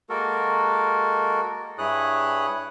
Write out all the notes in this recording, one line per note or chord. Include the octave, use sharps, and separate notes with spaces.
G#3 A#3 F#4 A4 A#4
G2 E4 G#4 C#5 D#6 F#6